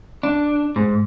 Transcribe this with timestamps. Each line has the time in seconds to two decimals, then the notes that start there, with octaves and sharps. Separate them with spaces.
0.23 D4
0.76 G#2